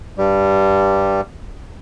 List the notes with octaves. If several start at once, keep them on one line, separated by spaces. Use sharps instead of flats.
G2 G3